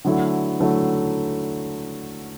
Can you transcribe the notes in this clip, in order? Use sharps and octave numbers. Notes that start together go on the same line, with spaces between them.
D3 F#3 A3 E4
D3 F#3 A3 E4